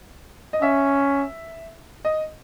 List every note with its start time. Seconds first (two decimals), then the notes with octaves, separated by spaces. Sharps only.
0.53 D#5
0.62 C#4 E5
2.05 D#5